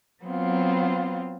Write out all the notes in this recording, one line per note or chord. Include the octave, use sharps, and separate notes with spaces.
F#3 B3 C4 F4